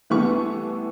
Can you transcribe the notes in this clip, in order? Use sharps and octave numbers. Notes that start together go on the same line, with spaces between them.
C2 E3 A3 B3 G4 C#6